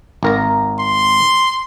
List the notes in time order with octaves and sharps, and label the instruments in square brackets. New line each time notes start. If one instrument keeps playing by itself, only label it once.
[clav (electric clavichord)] G#1 A#4 A#5
[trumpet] C6